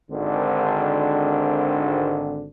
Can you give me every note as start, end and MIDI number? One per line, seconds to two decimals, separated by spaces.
0.10 2.46 32
0.10 2.46 50